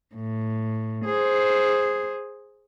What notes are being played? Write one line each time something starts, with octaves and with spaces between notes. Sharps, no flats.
A2
G#4 C5